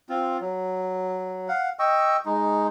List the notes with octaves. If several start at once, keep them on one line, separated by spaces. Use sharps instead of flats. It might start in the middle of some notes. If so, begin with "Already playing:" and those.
C4 F4
F#3
F5 F#5
D#5 G5 C#6 E6
G#3 D#4